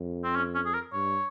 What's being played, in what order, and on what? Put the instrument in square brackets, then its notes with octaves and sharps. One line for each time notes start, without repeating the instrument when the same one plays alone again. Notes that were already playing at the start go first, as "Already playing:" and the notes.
Already playing: [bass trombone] F2
[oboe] C4
C#4
C#4
G#4
A#4
[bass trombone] G2 [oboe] C#5